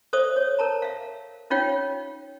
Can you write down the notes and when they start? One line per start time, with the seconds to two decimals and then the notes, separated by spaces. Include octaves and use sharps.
0.13 A4 C5 D5 E5 D#6
0.36 C#5
0.59 A#4 A5 A#5
0.82 E5 F5
1.50 C#4 D#4 F4 C#5 F5 G5